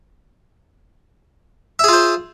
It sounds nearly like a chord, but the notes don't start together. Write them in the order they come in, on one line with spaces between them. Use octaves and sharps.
E5 G#4 F4 C5